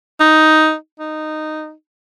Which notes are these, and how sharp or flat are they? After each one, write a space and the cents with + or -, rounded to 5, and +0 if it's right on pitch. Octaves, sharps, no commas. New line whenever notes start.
D#4 +5
D#4 -10